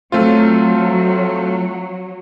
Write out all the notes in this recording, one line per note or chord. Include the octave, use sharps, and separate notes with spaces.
F#3 A3 C4 F4